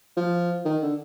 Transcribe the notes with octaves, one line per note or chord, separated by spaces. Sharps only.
F3
D#3
D3